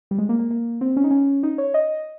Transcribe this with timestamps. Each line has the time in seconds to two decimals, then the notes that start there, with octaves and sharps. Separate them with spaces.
0.11 G3
0.18 G#3
0.29 A#3
0.39 A#3
0.51 A#3
0.81 C4
0.97 C#4
1.04 D#4
1.11 C#4
1.43 D#4
1.58 C#5
1.74 D#5